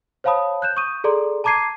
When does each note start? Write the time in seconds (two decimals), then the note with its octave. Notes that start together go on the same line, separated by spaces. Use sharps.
0.24 C5 C#5 F5 A5 B5 D#6
0.62 F#6 G6 E7
0.77 C#6 D#6 G6 D#7
1.04 G#4 A4 D5 A#5 C6
1.44 A5 A#5 D6 G#6 C7 D#7